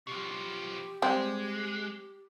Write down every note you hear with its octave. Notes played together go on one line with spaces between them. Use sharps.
B2 F3 G4
G3 G#3 C4